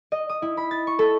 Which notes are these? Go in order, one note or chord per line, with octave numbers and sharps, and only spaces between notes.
D#5
D#6
E4
B5
A6
C#6
A4